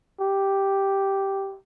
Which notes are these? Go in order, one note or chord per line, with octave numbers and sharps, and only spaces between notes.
G4